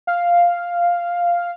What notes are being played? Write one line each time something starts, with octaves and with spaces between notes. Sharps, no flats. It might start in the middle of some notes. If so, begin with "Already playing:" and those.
F5